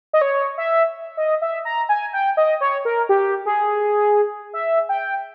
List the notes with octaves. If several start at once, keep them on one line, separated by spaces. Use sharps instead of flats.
D#5
C#5
E5
D#5
E5
A#5
G#5
G5
D#5
C#5
A#4
G4
G#4
E5
G5